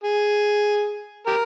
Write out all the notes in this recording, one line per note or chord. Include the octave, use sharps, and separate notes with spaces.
G#4
G4 A#4